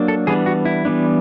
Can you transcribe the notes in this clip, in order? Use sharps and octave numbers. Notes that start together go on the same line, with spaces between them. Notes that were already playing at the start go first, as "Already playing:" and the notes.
Already playing: F#3 A#3 D4
A4
E3 G3 B3 D4 G#4
F#4
E4
E3 G3 B3 D4